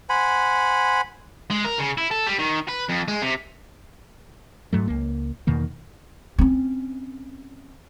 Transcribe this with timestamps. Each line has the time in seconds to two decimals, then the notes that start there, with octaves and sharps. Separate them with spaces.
0.09 C5 F#5 G#5 B5
1.51 G#3
1.65 A#4
1.79 C#3
1.98 E4
2.11 A4
2.27 G3
2.39 D#3
2.69 B4
2.89 F2
3.08 G#3
3.22 C3
4.73 G#2 F#3 A3
4.88 C#2 A#3
5.47 E2 B2 D#3 A#3
6.39 C4 C#4